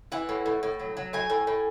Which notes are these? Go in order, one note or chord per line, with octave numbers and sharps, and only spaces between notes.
E3 F#5
A2
A2
A2
F#3
F#3
A2 G#5
A2
A2